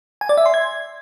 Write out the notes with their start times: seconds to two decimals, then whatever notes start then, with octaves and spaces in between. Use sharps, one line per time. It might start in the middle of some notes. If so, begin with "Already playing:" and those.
0.21 G#5
0.29 D5
0.37 E5
0.46 C6
0.54 G#6